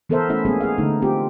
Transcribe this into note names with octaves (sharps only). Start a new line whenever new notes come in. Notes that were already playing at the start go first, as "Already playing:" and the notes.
E3 B3 A4 A#4 C5 E5
A3 C#4 E4 E5
G#3 A#3 B3 C#4 G#4
G#4 F5
D3 A3 D#4
C4 F4 G4